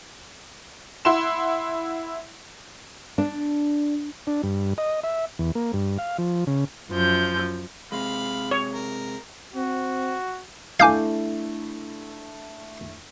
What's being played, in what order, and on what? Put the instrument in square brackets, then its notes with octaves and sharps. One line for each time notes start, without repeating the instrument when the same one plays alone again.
[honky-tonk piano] E4 F#5 C6 E7
[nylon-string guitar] D4
[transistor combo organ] D4
G2
D#5
E5
E2
A#3
G2
F5
F3
C#3
[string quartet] F#2 F3 G6
[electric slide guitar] C3 G#3 [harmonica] F5 B5
[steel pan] C#5
[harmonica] A#4
[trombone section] C4 [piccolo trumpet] F#4
[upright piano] A3 D4 E4 [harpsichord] F5 [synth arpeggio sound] G#5 D6 G6